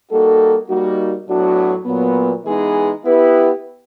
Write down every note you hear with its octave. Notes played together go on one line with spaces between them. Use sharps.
G3 A#3 D#4 F#4 A4
G3 A#3 D#4 F#4
A2 F#3 B3 D4 F#4
A#2 F#3 B3
E3 G#3 B3 D#4 G#4
B3 E4 G4 B4